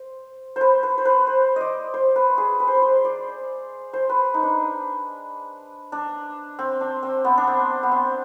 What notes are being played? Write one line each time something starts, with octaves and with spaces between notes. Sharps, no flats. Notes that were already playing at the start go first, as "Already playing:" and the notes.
Already playing: C5
B4 C5
B4
C5
B4
C5
D5 D#5
C5
B4
G#4
B4
C5
B4
C5
D5
C5
B4
D#4
D4
D4
C4
D4
C4
B3
D4
C4
B3
C4